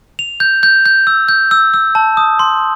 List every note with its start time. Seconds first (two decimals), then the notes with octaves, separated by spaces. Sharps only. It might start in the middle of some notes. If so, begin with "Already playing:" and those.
0.19 F7
0.40 G6
0.63 G6
0.86 G6
1.07 E6
1.28 G6
1.51 E6
1.74 E6
1.95 A5
2.17 D#6
2.39 C6